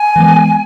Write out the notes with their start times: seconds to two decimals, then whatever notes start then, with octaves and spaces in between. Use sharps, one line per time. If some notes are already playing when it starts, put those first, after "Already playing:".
Already playing: G#5
0.16 E3 G#3 B3